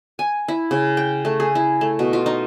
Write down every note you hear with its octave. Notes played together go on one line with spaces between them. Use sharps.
G#5
E4
C#3
G5
A3
G#4
E4
A3
B2
F4
D#4